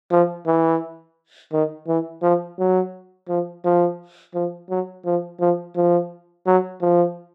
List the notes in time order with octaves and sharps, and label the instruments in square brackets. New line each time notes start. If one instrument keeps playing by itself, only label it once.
[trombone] F3
E3
D#3
E3
F3
F#3
F3
F3
F3
F#3
F3
F3
F3
F#3
F3